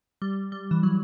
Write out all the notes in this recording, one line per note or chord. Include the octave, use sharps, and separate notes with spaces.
G3
G3
E3
F#3